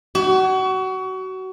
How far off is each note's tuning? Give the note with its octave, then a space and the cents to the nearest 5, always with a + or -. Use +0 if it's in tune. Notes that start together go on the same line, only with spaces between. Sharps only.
F#4 +25